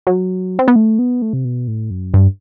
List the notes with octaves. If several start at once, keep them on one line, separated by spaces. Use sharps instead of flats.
F#3
C4
B3
A3
B3
A3
C3
B2
A2
F#2
G2